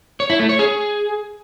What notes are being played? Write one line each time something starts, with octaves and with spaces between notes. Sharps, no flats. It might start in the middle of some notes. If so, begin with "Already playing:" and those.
C#5
E4
A3
C#5
G#4